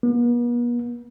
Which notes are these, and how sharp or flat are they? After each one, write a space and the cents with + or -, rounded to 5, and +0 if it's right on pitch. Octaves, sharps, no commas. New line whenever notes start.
B3 -45